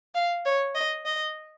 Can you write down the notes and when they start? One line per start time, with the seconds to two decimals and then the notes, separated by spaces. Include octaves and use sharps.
0.15 F5
0.45 C#5
0.75 D#5
1.05 D#5